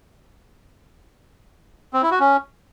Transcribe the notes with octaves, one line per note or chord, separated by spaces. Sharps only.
C4
E4
F#4
C#4